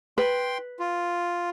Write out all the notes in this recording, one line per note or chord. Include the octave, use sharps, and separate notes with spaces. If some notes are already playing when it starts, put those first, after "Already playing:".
B4 G5 C6
F4